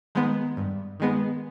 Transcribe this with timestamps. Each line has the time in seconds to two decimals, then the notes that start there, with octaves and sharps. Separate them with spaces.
0.15 D#3 G#3 B3
0.57 G2
1.00 D#3 G#3 B3